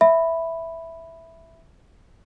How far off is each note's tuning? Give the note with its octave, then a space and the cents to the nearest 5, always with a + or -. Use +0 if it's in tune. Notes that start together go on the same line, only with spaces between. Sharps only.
E5 +0 B5 +0